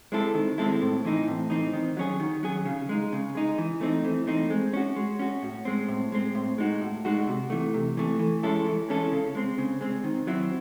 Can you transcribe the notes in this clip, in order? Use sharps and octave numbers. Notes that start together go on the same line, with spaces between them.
G#3 C4 E4 A4
D#3
G#3 C4 E4 A4
A2
E3 C4 D#4
A2
E3 C4 D#4
D#3
F#3 C#4 G#4
D#3
F#3 C#4 G#4
C#3
G#3 D#4
C#3
G#3 D#4
E3
A3 C4 D#4
E3
A3 C4 D#4
G#3
C#4 F#4
G#3
C#4 F#4
A2
G#3 C4
A2
G#3 C4
A2
G#3 D#4 F#4
A2
G#3 D#4 F#4
C3
E3 A3
C3
E3 A3
E3
G#3 C#4 E4 A4
E3
G#3 C#4 E4 A4
C#3
G#3 C4
C#3
G#3 C4
D#3
F#3 C4 E4